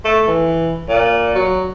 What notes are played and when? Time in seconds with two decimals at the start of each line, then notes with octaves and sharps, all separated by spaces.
0.05 A3
0.27 E3
0.89 A#2
1.35 F#3